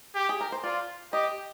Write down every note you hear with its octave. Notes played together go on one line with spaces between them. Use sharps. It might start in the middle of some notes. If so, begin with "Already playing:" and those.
G4
G#4
A#4
C5
F4 D5
G4 D#5